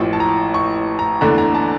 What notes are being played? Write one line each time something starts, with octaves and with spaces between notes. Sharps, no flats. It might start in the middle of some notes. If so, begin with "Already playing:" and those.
Already playing: A1 A2 F3
A5
A#5
C#6
A#5
E2 D3 A3 D4 A#5
A#5
A5